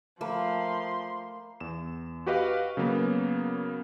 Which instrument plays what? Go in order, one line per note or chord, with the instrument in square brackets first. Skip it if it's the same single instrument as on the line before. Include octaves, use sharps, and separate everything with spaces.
[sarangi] F3 [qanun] A3 [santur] A#3 B5 [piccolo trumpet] C6
[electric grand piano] E2 E7
F#4 G4 B4 D#5 F5
C#3 F#3 A#3 B3